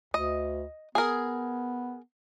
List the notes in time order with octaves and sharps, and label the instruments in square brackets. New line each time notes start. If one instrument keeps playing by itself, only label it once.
[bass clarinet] D2 [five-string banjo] D#5
[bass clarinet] B3 [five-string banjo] G#4 A#4